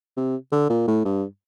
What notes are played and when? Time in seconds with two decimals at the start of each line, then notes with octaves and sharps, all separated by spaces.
0.17 C3
0.52 D3
0.69 A#2
0.87 A2
1.05 G2